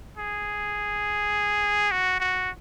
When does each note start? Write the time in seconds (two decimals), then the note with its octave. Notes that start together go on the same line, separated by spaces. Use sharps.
0.18 G#4
1.91 F#4
2.20 F#4